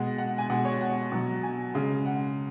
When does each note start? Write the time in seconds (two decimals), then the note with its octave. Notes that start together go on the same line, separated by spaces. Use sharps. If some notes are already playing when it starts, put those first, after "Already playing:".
Already playing: B2 G#3 F#5
0.18 F#5
0.38 G#5
0.50 B2 G#3 F#5
0.65 C#5
0.81 F#5
1.12 B2 F#3
1.43 G#5
1.74 C#3 G#3
2.06 F#5